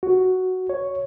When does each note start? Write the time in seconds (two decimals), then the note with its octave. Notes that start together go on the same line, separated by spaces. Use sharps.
0.03 F#4
0.70 C#5